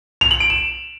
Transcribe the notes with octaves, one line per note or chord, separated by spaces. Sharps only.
F7
F#7
D7
E7